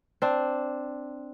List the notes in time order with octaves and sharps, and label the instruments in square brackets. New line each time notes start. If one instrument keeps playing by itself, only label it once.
[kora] C4 D4